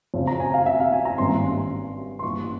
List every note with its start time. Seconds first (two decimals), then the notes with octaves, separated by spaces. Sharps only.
0.14 F2 C#3 F3
0.27 A#5
0.40 G#5
0.54 F5
0.66 E5
0.80 F5
0.92 G#5
1.05 A#5
1.18 G#1 G2 G3 A#3 C#4 C6
2.19 C6
2.23 G2 E3 A#3 E4 C#6